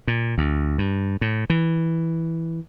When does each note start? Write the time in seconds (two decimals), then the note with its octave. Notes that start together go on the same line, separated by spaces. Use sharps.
0.07 A#2
0.38 D2
0.78 G2
1.21 A2
1.50 E3